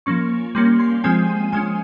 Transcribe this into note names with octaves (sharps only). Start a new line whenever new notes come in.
F3 A#3 C#4 C#6
G3 A#3 C#4 C6
C6
F3 G#3 C4 G#5
F3 G#3 C#4 G#5